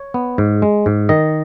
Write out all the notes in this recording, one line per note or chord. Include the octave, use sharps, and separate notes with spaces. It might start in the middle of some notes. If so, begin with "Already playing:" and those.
Already playing: C#5
B3
G#2
G#3
G#2
D#3 D#5